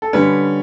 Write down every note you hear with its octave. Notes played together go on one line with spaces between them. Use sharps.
A4
D3 G3 C#4 B4